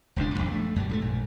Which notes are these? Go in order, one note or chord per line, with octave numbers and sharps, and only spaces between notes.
E1 C#2 G#2 D4
A1 F2 G#2
G#3 A3
F#2 G3
G#2 G3 A3
A#1